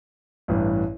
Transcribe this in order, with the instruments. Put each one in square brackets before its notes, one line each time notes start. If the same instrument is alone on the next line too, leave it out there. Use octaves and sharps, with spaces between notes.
[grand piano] A1 G2 E3